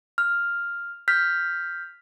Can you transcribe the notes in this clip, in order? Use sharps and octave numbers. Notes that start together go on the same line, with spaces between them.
F6
F6 G6 B6